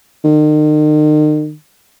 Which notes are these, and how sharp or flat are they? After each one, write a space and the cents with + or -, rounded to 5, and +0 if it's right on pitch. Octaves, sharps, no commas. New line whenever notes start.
D#3 -40